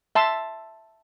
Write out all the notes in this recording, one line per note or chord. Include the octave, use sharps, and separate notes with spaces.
E5 A5 C6